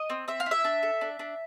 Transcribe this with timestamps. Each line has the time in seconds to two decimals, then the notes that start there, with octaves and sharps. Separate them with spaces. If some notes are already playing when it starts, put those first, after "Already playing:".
Already playing: D#5
0.10 C4
0.28 C4 E5
0.40 F5
0.46 E4
0.51 E5
0.64 D4
0.83 A4
1.01 D4
1.19 D4